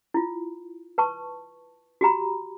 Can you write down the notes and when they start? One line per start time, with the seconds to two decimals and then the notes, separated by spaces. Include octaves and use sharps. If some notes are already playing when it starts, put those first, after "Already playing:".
0.14 E4 F4
0.98 B4 A5 C#6
2.01 F#4 G4 A#5 B5